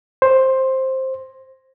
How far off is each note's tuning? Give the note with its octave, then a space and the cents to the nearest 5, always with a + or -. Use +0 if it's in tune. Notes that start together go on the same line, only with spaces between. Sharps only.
C5 +10